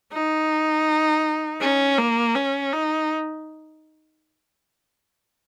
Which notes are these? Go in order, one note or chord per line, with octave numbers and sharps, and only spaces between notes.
D#4
C#4
A#3
C#4
D#4